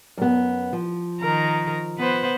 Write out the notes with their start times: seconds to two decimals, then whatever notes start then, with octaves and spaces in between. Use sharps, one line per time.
0.18 F#2 B3
0.73 F3
1.21 D#3 A#4
1.97 B3 B4 C5